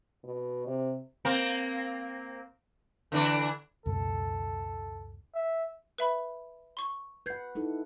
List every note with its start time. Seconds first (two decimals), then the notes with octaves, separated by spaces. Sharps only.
0.24 B2
0.67 C3
1.25 A#3 C4 A#4
3.12 D3 E3 D4
3.86 C#2 F#2 B2 A4
5.35 E5
5.98 B4 E5 B5
6.77 C6 C#6
7.26 B4 F#5 G6 G#6 C7
7.55 D#4 E4 A4